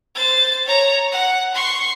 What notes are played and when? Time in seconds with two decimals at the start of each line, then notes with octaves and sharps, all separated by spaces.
0.16 C5 A6
0.66 C#5 A#5
1.12 F#5
1.54 C6 C#6